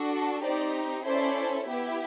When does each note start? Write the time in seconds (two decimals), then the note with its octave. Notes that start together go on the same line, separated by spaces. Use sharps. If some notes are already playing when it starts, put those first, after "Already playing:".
Already playing: D4 F#4 A4
0.44 C4 D#4 G4 C5 D5
1.06 C#4 E4 A4 C5 D5
1.68 B3 E4 G4